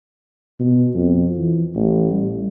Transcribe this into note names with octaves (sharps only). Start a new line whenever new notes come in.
B2
F2
E3
A1
G3